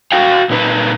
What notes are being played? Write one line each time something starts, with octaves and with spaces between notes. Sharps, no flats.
F#4 F5 G5
A#2 D#4 B4